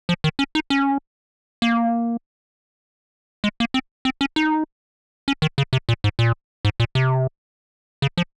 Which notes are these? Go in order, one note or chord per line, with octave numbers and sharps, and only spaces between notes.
F3
D#3
C#4
D#4
C#4
A#3
G#3
A#3
C4
C4
C#4
D#4
C#4
D#3
C#3
C3
A#2
G#2
A#2
G#2
A#2
C3
C#3
F3